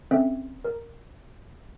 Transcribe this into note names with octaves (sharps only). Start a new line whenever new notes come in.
C4 C#4 A4 E5 G5
A#4